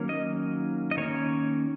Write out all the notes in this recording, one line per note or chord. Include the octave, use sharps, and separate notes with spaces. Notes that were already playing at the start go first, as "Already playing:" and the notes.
Already playing: D#3 F#3 A#3 C#4
D#5
D#5
D#3 A#3 C#4 C#5